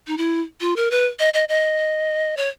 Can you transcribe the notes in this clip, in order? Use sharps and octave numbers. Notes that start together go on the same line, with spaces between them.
D#4
E4
F4
A#4
B4
D#5
D#5
D#5
C#5